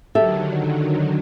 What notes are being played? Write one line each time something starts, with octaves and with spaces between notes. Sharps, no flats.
D3 D#3 F#3 G4 A4 E5